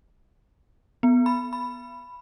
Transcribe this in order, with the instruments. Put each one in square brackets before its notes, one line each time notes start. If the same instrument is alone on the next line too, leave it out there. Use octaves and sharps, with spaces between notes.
[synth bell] B3
B5
B5